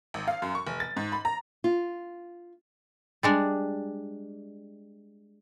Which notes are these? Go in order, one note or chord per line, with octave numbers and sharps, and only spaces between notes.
G#1
F5
F#2
C#6
F1
A6
G#2
B5
A#5
F4
G3 G#3 D4